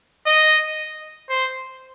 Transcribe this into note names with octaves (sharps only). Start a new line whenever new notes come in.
D#5
C5